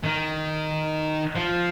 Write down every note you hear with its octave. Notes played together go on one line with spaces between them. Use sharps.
D#3
F3